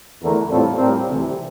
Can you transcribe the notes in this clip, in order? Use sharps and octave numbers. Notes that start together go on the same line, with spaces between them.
E2 D3 A3 E4 A#4
A2 G3 C4 F4 A4
A2 G3 C4 G4 A#4
D2 C3 E3